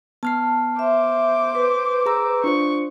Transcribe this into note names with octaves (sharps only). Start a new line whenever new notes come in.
B3 A5 F6 C7
C5 E5 D6
B4
G#4 A#5 E6
D4 F4 C5 C#6